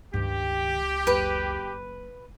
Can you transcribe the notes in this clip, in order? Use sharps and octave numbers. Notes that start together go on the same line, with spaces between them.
C#2 G2 D#3 G4
F#1 B4